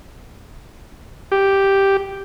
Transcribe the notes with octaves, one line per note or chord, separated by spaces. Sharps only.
G4